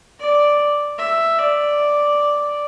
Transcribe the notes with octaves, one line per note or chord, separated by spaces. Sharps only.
D5
E5
D5